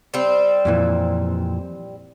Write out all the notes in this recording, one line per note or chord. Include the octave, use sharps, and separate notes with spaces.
G3 C4
F2 A#2 E3